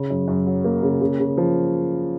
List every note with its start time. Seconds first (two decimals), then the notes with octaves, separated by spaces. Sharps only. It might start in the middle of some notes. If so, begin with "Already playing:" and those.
Already playing: C#3
0.10 F#2
0.28 F#2
0.46 F#3
0.64 A#3
0.83 C#3
1.01 C#3
1.20 C#3
1.38 F3